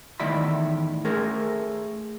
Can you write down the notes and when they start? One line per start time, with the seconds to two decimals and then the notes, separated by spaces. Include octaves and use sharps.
0.20 E2 A2 D#3 D5 E5 B5
1.05 A3 G#4 A#4 C5